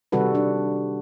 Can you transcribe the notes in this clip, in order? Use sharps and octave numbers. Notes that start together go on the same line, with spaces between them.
C3 D#3 G3 F#4 A4 B4
D4